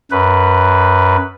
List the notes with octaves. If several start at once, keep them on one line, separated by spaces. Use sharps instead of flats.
F#2 B4